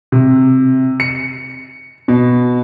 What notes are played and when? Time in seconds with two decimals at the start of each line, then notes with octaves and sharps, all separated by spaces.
0.12 C3
1.00 C#7
2.08 B2